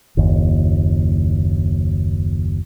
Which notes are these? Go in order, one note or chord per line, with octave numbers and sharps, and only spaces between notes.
F#1 D#2